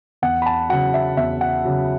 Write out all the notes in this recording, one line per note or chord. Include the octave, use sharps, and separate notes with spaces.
E2 F#5
B5
A5
C#3 F#3 F#5
E5
E2 E5
F#5
C#3 F#3